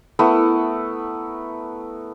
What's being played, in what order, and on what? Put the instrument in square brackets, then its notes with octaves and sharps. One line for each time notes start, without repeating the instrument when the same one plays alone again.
[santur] A3 B3 E4 A#4